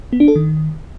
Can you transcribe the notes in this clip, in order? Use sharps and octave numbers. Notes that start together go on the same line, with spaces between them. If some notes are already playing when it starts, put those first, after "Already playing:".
B3
D4
A4
D#3